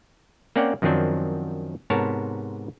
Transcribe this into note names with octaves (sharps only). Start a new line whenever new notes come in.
A#3 C4 C#4 D5 F#5 G5
F#2 D#3 F3 F#3 C4 D4
G#2 C3 B3 A#4 C#5 A5